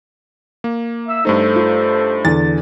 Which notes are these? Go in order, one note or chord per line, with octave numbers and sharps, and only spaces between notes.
A#3
E5 E6
G2 A3 D#4 A4 C5
F4
E2 D3 A6